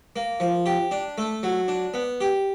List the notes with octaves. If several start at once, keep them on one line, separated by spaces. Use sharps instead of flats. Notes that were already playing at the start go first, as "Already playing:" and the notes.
A#3
F3
G4
D4
A3
F#3
D4
B3
G4